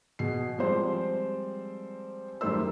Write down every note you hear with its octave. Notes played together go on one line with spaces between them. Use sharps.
B2 G#4 C7
F3 G3 G#3 C4 C5
F#2 D#3 G3 A3 C5 E6